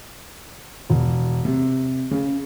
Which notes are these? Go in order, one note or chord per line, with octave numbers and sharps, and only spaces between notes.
E1
C3
C#3